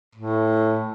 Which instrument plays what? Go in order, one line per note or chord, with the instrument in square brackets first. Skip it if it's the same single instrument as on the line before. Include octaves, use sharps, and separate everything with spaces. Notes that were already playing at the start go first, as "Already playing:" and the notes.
[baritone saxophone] A2